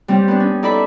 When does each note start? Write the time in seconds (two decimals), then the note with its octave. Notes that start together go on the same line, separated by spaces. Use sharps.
0.08 G3 C4 C#4 G4
0.28 B3 D4
0.40 C#4
0.63 D#4 A4 D5 E5 B5